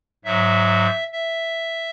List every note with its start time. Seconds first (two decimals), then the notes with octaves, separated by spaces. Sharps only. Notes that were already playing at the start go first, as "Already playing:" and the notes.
0.25 G#2 F#3 E5
1.13 E5